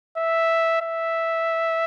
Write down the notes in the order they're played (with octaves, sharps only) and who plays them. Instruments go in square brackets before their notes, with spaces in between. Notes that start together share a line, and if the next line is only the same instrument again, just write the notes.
[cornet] E5
E5